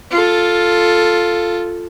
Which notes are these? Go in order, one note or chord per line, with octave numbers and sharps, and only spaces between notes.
F4 A4